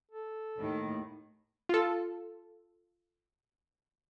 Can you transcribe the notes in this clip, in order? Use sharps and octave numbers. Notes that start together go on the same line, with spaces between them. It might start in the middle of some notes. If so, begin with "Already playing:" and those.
A4
D#2 A2 D#3
F4 A4